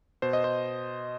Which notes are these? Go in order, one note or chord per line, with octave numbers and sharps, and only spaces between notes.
B2 C5
D#5
C5